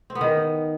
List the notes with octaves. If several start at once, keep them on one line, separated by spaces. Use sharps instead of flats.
C4
B3
D#3